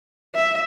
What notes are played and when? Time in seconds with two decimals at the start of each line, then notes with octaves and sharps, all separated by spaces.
0.35 E5